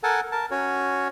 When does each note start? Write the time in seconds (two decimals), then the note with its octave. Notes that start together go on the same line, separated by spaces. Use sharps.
0.03 A4 A#4 F#5 G#5 A5
0.32 A#4 A5
0.51 C#4 F#4 C#5